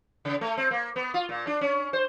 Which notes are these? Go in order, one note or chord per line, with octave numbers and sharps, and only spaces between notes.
C#3
A3
C4
A#3
B3
F4
A#2
D4
C#4
C5